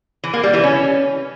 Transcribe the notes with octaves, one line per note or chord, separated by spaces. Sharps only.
E3
A#3
G3
E3
C#4